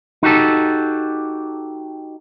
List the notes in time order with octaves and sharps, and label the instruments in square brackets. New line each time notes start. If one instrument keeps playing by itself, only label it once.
[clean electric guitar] D#4 F#4 G4 A4